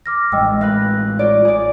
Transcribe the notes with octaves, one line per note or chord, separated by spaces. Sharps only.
D6 F6 A#6
A1 G#3 D#5 G5 E6
B4 F5 F#6 A#6
F4 C#5 D5
G#4 D5